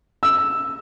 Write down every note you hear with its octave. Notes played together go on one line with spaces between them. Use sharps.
E6